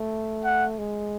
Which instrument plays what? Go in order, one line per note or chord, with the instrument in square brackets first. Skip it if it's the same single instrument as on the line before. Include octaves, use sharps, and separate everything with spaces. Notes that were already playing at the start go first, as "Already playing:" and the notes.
Already playing: [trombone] A3
[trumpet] F#5
[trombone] G#3